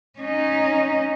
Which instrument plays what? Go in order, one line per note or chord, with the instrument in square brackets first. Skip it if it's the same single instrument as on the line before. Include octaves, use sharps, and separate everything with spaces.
[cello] C#4 D#4